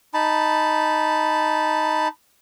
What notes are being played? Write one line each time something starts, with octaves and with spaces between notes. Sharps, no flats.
D#4 A5 B5